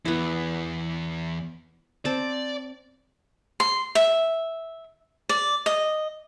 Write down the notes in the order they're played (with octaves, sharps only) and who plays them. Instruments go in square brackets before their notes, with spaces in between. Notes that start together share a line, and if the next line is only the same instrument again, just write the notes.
[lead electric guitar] E2 [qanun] B3 E4
[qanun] C4 A5 [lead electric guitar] D5
[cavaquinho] C6
E5
D5
D#5